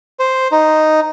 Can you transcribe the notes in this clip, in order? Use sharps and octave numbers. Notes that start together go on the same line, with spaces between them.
C5
D#4